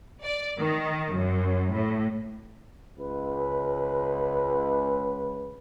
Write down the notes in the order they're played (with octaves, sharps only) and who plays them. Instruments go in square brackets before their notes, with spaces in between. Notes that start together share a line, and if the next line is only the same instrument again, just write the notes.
[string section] D5
D#3
F#2
A2
[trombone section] C#2 B4